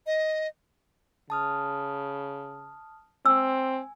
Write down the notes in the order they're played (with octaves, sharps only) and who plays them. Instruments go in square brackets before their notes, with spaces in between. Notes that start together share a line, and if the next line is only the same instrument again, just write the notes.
[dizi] D#5
[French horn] C#3 [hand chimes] A5 D#6 F6
[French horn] C4 [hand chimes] G#5 [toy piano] E6